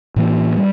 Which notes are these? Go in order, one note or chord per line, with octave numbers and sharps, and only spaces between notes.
A2 E3 A#3
G3